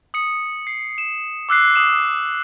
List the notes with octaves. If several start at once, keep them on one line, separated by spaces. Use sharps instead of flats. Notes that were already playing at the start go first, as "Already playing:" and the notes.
D#6 C#7
C7
E7
D6 E6 F#6 C7
D#6 E7